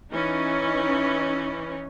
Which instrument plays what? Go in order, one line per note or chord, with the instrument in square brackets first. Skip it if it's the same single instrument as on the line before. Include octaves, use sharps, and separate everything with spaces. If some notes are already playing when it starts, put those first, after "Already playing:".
[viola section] E3 C#4 D#4